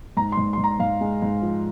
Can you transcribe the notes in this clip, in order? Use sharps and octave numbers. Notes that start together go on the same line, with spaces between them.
G#2 A#5
C6
G#2
G#2 C6
A#5
G#2 F5
G#3
G#2
F3